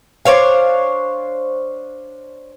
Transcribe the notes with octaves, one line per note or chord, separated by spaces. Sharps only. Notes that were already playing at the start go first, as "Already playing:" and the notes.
D4 C5 C#5 F5